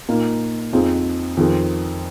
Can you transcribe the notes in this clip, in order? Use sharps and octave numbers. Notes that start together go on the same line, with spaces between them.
A#2 A#3 D#4
F2 F3 C4 D#4 G#4
F2 D#3 C4 F4 G#4